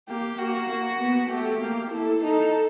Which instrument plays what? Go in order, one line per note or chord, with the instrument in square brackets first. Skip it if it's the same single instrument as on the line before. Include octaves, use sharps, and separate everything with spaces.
[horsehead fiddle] A#3 [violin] G4
[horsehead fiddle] A#3 [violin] F#4
[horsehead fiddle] A#3
B3
[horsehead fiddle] A3 [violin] G4
[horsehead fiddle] A#3
[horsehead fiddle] E4 [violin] A4
[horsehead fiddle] D#4 [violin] A4